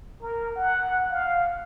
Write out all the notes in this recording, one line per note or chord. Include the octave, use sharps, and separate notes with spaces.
A#4
F#5
F5